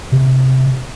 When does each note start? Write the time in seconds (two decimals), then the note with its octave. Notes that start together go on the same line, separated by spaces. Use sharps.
0.12 C3